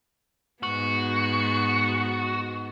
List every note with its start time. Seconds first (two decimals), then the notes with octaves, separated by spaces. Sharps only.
0.63 G#2 B3 F#4